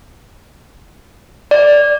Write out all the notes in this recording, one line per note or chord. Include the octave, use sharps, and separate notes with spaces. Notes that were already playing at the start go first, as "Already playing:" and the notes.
D5